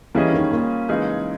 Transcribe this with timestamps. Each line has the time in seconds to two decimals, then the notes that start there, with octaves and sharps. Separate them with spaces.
0.14 E3 G3 A#3 C#4 G#4 D#5
0.33 D#3
0.51 A#2
0.89 C#3 E3 G#3 D#4 G#4